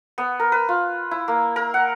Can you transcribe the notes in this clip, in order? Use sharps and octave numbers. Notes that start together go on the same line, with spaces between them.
B3
A#4
B4
F4
E4
A#3
A#4
F#5